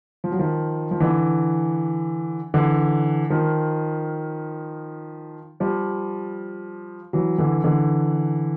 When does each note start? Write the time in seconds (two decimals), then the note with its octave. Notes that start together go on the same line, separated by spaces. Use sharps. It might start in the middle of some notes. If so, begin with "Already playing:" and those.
0.24 F3
0.32 F#3
0.39 D#3 F3
0.91 F3
1.00 D3 E3
2.54 D3 E3
3.30 D#3 F3
5.60 F3 G3
7.13 E3 F#3
7.38 D3 E3
7.64 D3 E3